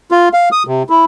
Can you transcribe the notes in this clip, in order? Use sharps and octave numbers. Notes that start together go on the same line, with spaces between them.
F4
F5
D#6
C3
E4